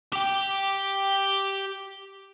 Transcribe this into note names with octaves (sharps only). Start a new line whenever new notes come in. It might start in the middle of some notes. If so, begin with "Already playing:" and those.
G4 G5